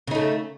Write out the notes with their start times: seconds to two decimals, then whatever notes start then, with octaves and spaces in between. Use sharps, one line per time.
0.07 C#3
0.11 D#4
0.15 A3